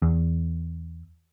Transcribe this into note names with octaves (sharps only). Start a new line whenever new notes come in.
E2